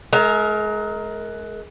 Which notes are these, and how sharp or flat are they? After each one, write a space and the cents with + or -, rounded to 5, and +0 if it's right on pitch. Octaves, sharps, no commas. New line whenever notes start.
G#3 +35 A#4 +0 E5 -5